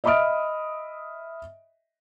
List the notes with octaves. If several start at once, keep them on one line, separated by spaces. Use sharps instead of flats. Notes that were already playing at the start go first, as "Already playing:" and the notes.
D#5 E5 B5 D#6 F6 D7